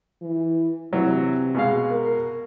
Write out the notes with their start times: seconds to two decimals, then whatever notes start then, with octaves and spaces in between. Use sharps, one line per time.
0.22 E3
0.93 C3 E3 F#3
1.55 B2 G#3 F5
1.91 A#4